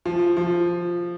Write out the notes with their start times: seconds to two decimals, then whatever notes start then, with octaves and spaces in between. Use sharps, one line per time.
0.06 F3
0.37 F3